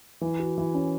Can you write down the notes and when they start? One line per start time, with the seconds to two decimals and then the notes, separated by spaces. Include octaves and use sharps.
0.21 E3
0.39 F#4
0.58 E3
0.74 C#4